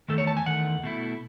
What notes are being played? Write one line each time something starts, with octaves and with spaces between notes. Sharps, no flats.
E2 D#3 A3 A4
C#5
A5
G#5
E2 D#3 A3 F#5
B2 A3 E4